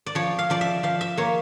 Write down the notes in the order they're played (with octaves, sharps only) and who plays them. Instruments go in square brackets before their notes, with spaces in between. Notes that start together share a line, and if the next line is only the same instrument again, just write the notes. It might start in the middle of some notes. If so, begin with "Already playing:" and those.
[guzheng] D5
F3 C#5
F5
F3 D5
E5
F3 F5
E5
A#3 C#5